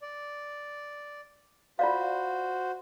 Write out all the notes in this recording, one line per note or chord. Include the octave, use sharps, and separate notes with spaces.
D5
F4 F#4 C5 D5 F5